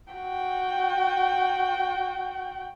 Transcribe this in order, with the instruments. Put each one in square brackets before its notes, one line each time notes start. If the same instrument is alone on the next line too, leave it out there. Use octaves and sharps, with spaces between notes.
[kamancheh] F#4 G5